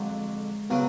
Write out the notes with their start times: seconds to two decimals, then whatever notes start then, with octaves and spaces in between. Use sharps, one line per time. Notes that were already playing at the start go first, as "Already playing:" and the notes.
Already playing: F2 D3 F#3 G#3
0.70 C#3 F#3 B3